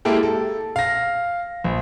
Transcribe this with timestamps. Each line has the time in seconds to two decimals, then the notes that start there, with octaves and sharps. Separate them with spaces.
0.05 G#3 A#3 E4 G4 A4
0.23 A4
0.76 F5 A#6
1.64 A#1